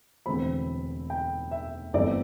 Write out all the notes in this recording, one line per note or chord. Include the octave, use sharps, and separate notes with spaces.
E1 E2 D3 A3 C4 B5
G5
E5
G1 G2 E3 A3 C4 D5